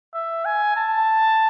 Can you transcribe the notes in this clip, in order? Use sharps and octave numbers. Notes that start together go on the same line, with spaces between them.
E5
G#5
A5